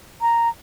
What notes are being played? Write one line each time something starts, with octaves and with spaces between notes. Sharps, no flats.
A#5